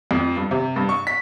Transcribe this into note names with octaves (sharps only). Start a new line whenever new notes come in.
F2
G2
C3
G2
C#6
B6